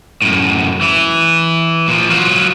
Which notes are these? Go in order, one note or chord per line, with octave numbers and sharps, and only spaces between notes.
F#2 A2
E3 E4
A#2 F3
F#3 F4